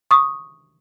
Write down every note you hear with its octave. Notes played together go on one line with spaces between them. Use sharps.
C#6 D#6